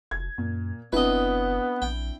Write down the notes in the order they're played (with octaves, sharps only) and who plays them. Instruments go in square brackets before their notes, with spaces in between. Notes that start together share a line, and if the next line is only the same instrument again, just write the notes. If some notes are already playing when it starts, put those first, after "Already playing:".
[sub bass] F1 [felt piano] G#6
[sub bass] F#2 [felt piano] A#2
[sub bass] F#1 [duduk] B3 [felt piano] C4 D4 E4 [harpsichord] B4 D#5
[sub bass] A#1 [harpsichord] G5